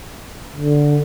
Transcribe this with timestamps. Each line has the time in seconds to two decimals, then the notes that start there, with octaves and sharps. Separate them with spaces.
0.56 D3